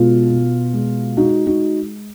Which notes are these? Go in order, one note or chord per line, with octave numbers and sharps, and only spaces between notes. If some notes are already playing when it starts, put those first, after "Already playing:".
Already playing: B2 G#3 F4
B2
G#3
G#3 D#4 F#4
D#4 F#4